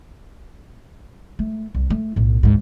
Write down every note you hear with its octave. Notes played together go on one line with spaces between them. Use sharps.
A3
C2
A3
B1 A2
D2 G#2